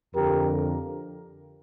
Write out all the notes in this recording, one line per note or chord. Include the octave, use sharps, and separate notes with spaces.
F2 D3 G4 A#4